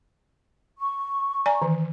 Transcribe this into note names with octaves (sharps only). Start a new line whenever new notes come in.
C#6
D5 G#5 A#5
D#3 E3